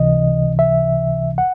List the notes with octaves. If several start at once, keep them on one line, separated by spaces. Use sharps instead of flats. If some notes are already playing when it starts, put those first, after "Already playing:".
Already playing: C#2 C3 E3 D#5
E5
F#5